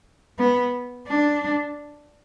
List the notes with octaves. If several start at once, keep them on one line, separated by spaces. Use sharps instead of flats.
B3
D4